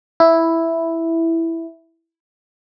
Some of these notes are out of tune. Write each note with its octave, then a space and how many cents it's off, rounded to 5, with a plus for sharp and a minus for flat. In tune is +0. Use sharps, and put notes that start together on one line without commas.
E4 +0